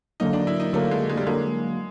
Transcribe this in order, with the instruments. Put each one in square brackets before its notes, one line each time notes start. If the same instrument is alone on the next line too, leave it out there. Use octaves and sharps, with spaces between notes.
[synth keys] D3 F#3 A#3 [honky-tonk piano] D#4
[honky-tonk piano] D4
E4
D#4
[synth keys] D3 F#3 A#3 [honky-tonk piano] A3
[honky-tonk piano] G#3
G#3
G3
[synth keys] D3 F#3 A#3 [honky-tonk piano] G#3